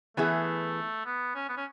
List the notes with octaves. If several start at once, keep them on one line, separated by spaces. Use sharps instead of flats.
E3 A3 B3 E4 G#4
B3
C#4
B3
C#4